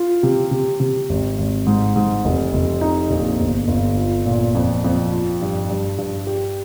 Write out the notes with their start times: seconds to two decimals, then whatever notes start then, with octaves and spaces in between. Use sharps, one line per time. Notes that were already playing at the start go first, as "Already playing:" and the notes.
Already playing: F4
0.23 C3
0.51 C3
0.80 C3
1.09 G#1
1.38 G#1
1.66 G#2
1.96 G#2
2.25 F1
2.54 F1
2.81 D#4
3.10 A#1
3.40 G1
3.68 G1
3.97 F4
4.26 A#2
4.55 F2
4.84 F2
5.12 F4
5.41 G2
5.69 G2
5.98 G2
6.27 G4